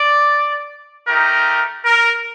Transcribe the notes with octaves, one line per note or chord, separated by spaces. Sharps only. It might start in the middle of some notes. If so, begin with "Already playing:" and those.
Already playing: D5
A3 D#4 G4 A#4
A#4